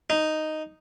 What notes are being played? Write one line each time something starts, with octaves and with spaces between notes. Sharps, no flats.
D#4